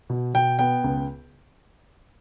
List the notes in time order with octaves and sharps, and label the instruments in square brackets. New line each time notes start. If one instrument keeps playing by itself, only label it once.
[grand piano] B2
B2 G5
B3 G5
C#2